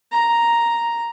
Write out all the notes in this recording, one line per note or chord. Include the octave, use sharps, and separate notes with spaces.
A#5